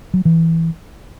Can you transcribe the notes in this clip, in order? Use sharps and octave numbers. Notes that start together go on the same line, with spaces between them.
F#3
E3